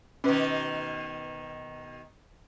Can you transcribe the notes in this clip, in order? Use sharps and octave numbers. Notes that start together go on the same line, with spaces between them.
B2 D#3 C#4 B4